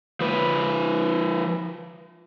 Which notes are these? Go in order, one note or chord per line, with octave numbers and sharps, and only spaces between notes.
F3 B4